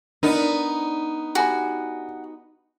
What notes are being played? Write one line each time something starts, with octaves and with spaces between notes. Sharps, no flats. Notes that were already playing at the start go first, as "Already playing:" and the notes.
B3 D4 D#4 A#4 D5
F#4 G4 G#5 B5